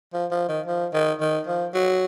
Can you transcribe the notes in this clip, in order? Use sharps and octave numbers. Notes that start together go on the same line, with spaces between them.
F3
F3
D#3
F3
D#3
D#3
F3
F#3